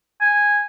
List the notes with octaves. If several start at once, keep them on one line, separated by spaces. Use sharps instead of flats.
G#5